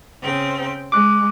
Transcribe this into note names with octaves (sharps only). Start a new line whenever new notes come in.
C#3 C4 G5
G#3 D6 F#6